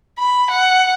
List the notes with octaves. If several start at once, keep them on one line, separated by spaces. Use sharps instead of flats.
B5
F#5